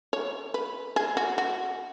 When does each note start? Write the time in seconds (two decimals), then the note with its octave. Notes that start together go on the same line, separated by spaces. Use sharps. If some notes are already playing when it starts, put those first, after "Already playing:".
0.13 C#5
0.54 B4
0.96 G#4
1.17 F#4
1.38 F#4